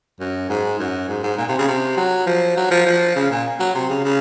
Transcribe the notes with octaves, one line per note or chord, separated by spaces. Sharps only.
F#2
G#2
F#2
G#2
G#2
A#2
C3
C#3
C3
F#3
F3
F#3
F3
F3
C#3
A#2
F#3
C3
C#3
C#3